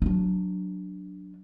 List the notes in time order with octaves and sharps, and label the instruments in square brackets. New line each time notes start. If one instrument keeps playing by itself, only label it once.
[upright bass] F#3 D4